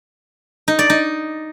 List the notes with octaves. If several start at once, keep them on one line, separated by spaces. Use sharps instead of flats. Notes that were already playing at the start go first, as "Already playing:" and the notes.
D#4
D5
D#4